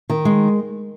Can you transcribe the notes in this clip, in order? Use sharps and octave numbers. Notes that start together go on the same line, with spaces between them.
D#3
G#3